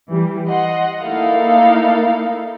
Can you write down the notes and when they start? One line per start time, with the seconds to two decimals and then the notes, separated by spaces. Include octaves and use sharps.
0.11 E3 G3
0.47 D#5 F#5 C6
1.01 A#3 D#4 E4 A4 A#4 F5